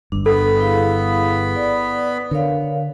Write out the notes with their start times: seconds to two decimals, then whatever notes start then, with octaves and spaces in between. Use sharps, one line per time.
0.12 G1 G2 D4
0.26 B3 A4 B5
0.60 E4 G#4 F5
1.56 D5
2.31 D3 A#4 C#5 F5